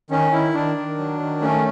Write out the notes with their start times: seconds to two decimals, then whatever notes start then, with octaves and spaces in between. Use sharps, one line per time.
0.11 D#3 C#4
0.32 D#3 E4
0.54 D#3 D4
0.77 D#3
0.98 F#3
1.20 D#3
1.42 A3 C#4